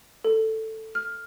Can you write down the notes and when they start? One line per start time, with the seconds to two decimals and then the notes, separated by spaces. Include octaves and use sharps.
0.24 A4
0.95 F6